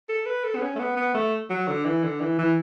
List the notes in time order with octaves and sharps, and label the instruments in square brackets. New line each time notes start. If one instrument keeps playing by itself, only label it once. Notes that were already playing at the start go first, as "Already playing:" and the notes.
[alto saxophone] A4
B4
A4
B3
C#4
A3
B3
B3
A3
F#3
D3
E3
D3
E3
E3